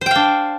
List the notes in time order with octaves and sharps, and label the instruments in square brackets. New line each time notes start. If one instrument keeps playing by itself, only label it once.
[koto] C5
G5
F5
D4